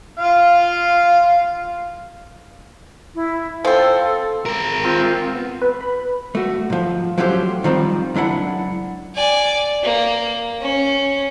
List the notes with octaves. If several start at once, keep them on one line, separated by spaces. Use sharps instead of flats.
F4 F5
E4
F3 C4 A4
G#3 A#4
C4 F4
B3
B4
B5
A3 F#4
G#2 F3
F3 F#3 A3 C#4 G4 C5
D#3 F3 G3 C4
C#2 F#2 D4 E4 F#5
D5 G#5
A#3
C#4